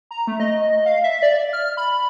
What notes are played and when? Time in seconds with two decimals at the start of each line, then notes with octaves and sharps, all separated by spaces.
0.11 A#5
0.27 A3
0.40 D#5
0.62 D#5
0.86 F5
1.04 E5
1.23 D5
1.53 F6
1.77 B5